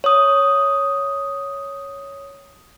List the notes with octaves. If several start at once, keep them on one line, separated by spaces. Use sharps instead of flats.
C#5 D#6